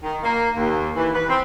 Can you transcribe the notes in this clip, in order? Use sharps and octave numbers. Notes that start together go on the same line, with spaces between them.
D#3
A#3
D#2
E3
B4
C4